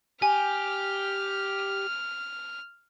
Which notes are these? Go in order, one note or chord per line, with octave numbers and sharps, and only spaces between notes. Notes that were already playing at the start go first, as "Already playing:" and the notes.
G4 G#5 F6